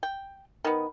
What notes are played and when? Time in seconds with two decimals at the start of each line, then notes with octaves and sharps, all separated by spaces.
0.03 G5
0.64 D#3 B3